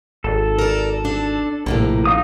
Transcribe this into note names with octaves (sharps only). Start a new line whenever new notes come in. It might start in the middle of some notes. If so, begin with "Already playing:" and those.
G#1 A4
A#4 D5
D4
A#1 A2 C3 A#3
D#4 F5 D#6